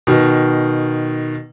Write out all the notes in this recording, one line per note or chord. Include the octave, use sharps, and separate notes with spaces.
B2 D#3